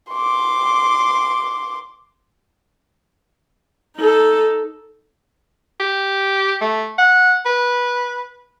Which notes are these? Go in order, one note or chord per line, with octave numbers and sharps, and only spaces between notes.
C6 D6
D#4 A4
G4
A3
F#5
B4